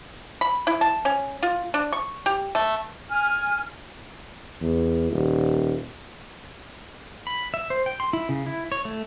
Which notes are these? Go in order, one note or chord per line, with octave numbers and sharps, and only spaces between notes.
B5
E4
A5
C#4
F4
D4
C#6
G4
A3
G#5 F6
E2
D#1
B5
E5
C5
G5
C6
E4
C#3
E4
C#5
A3